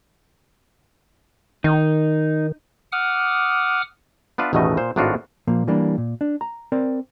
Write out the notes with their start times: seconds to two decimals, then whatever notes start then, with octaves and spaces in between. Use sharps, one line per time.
1.64 D#3 D#4
2.92 F#5 D6 D#6 F6
4.38 B3 D4 F4 B4 E5
4.53 A1 E2 B2 D#3 A3 D#5
4.77 A#2 C5
4.96 G#1 A2 D4 D#4 F4 F#4
5.47 A#2 F3 A#3
5.67 E3 G3 A#3 D4
5.98 A#2
6.21 D4
6.41 A#5
6.72 C4 A#4 D5